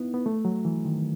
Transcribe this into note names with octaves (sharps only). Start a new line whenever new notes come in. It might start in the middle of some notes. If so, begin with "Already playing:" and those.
Already playing: B3 D#4 E4
B3
A3
F#3
E3
D#3